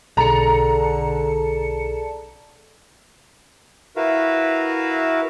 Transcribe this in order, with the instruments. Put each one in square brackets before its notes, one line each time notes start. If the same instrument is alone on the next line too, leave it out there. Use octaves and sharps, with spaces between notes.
[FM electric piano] B1 A5 C#7 [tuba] D3 [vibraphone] G#4 A4 D5 [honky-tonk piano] A#5
[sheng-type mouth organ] E4 F#4 A#4 B4 E5 F5